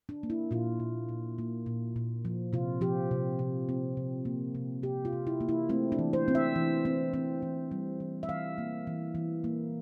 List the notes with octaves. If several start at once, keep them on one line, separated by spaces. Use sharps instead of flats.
D4
A#3
E4
A#2 F4
A#2
A#2
A#3
A#2
A#2
F3
C3 F4
F3 G4
C3
C3
C4
C3
A#3
C3
C3 G4
F4
C3
E4
A#3
E4
A3 C4
D4
E3
C5
C4
E5
E3
C4
C4
E3
G3
E3
E5
E3 F5
A#3
E3
E3
A#3